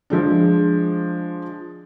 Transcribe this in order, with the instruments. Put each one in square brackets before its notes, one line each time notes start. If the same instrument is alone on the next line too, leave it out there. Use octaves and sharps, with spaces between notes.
[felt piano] F3 G#3 D4